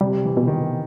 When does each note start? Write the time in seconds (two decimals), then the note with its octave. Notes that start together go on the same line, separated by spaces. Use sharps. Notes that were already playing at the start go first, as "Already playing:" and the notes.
0.01 C3 G3
0.25 E3
0.37 B2
0.47 D#3